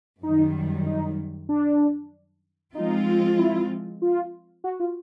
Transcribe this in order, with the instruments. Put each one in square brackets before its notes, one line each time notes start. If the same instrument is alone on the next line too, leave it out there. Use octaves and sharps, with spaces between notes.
[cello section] F#2 D#3 G3 [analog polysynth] D#4
[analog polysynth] D#4
D4
[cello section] F3 G#3 C4 F4 [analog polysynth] D#4
[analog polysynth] E4
F4
F#4
F4